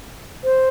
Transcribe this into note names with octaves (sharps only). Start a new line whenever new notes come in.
C5